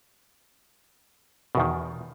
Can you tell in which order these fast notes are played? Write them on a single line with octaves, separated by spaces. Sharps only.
B2 E2 D#3